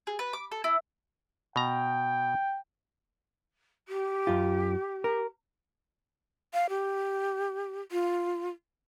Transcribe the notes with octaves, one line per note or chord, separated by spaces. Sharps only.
G#4
B4
D6
A4
E4
B2 G5 A#5
G4
F#2 F4
A#4
F5
G4
F4